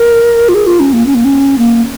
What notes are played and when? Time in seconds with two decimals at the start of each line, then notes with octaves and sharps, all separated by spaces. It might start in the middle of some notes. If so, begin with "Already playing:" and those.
Already playing: A#4
0.49 F4
0.54 G#4
0.67 F4
0.80 C#4
0.93 A#3
1.06 C#4
1.15 A#3
1.25 C#4
1.58 A#3